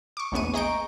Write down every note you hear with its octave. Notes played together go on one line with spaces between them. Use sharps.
C#6 D6
A#1 E2 A2 B3 C#6 D#7
G#4 D#5 A#5 C#6 G6 D7